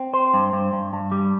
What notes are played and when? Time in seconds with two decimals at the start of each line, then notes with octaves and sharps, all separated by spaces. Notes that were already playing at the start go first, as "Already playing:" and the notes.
Already playing: C4
0.14 C5
0.34 G2
0.53 G2
0.73 G2
0.93 G2
1.12 G3